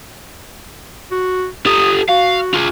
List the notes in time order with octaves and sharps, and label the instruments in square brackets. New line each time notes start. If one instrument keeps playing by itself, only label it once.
[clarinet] F#4
[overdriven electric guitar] G4 A4 [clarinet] D#6
[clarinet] F#4 [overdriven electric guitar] F5
[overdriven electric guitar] F4 G#4